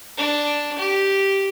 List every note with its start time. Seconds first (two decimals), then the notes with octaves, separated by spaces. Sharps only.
0.17 D4
0.78 G4